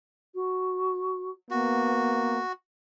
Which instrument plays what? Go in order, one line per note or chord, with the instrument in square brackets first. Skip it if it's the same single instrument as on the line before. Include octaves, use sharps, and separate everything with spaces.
[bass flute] F#4
[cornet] A#3 [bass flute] B3 [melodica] F#4